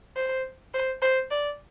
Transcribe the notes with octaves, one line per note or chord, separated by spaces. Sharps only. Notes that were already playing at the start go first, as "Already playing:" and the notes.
C5
C5
C5
D5